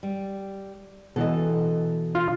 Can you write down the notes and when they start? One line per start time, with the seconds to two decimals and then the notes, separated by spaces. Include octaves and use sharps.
0.03 G3
1.16 B2 E3 A4 D#5
2.15 F4